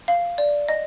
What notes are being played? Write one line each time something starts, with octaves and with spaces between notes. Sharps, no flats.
F5
D5
D#5